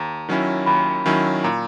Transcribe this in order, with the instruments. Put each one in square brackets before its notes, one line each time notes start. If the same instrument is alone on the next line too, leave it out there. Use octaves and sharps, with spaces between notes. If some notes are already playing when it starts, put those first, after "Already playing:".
Already playing: [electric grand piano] D#2 [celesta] A#5
[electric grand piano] D#3 F#3 C#4 E4
[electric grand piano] D#2 [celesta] B5
[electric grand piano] D#3 F#3 C#4 E4
[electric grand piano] A#2 [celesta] A#5